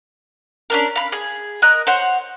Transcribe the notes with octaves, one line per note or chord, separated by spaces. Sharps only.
C#4 D4 A#4
F5 B5
G#4
A#4 D#5 F#6
C5 C#5 F#5